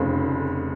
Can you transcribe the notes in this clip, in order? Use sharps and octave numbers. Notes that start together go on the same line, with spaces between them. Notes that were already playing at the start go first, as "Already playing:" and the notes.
Already playing: F1 F2 C#3